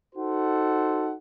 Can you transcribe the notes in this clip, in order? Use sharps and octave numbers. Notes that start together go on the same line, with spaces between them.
D#4 F#4 A4 C5 F#5